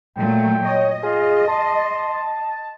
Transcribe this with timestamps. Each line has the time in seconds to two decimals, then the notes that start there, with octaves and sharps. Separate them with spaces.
0.17 A#2 F#3 A3 G5
0.66 C#5 D#5
1.03 F4 G#4
1.48 A5 C6